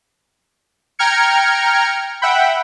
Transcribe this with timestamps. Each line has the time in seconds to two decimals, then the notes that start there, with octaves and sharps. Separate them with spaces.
0.99 G5 A#5 F6 G#6 C#7
2.22 E5 F#5 G5 B5